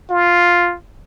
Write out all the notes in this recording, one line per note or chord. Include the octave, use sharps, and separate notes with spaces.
F4